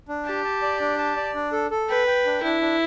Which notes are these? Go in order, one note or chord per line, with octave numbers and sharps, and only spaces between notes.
D4
G4 A5
A5
D5
D4
A5
D5
D4
A4
A4
B4 G5
G5
D4
D4 E4
D4